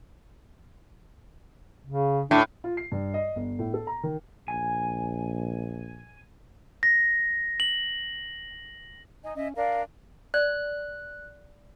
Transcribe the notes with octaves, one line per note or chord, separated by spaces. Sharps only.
C#3
A2 D4
F4
C7
G2
D#5
G1
A2
A4
A#5
D#3
A#1 G#5
A#6
F#7
D#4 D#5 G#5
C#4 D#5 E5
D4 A#4 D5 F5
D5 F#6